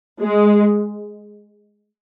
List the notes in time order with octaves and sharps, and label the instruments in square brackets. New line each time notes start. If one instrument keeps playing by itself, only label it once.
[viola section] G#3